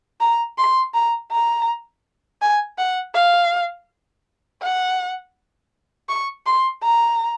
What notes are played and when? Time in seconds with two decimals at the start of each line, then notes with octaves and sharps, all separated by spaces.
0.21 A#5
0.58 C6
0.94 A#5
1.32 A#5
2.42 G#5
2.78 F#5
3.15 F5
4.62 F#5
6.09 C#6
6.46 C6
6.83 A#5